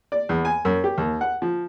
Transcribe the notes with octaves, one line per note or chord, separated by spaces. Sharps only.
D5
E2
G#5
F#2
G4
D#2
F#5
F3